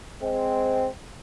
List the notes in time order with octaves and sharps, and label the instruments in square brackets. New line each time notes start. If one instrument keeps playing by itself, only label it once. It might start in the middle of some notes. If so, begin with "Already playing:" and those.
[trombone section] G#3 C4